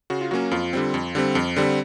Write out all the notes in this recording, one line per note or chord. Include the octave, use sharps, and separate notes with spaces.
C#3 F#4
F4
F#3 A#3 C#4 F#4
F2 F4
D3 G3 C4
F2
D3 G3 C4
F2
D3 G3 C4